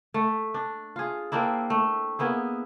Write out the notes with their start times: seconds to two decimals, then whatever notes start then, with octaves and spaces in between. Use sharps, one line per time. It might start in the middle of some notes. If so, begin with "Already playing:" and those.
0.14 A3
0.54 D4
0.96 F4 G#4
1.32 A#3 C4 D4 E4
1.70 A3
2.19 A#3 B3 E4 G#4